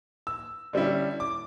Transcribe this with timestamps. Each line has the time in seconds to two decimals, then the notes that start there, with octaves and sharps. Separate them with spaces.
0.27 E6
0.73 D3 G3 C#4 E4
1.20 D6